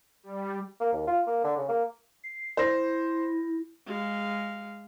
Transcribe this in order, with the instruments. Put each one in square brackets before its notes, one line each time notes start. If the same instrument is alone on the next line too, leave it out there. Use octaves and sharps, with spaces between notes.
[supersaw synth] G3
[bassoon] A#3
D#2
F4
A#3
D3
C#3
A#3
[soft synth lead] C7
[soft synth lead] E4 [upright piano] C5 A#6
[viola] G#3 F5